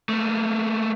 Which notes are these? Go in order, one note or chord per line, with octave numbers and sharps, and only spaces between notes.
A3 A#3